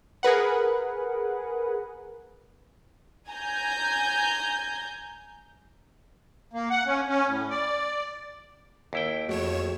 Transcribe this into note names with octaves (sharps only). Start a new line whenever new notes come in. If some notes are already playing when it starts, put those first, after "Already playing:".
G#4 A#4 B4 F#5
G#5 A#5 G6
A#3
F#5
C#4
C#4
A2
D5
D#2 E4 G5
F2 A3 F#4 G#4 C#5 E7